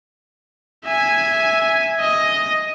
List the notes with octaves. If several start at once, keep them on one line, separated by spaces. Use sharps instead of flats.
E5 G#5
D#5